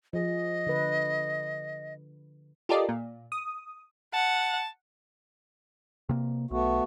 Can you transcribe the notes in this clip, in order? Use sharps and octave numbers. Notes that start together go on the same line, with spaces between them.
F3 G#4 D#5
D3 B4
F4 G4 A4 A#4 D5 D#5
A#2
D#6
F#5 A5
C3 A#3
B1 A3 B3 F#4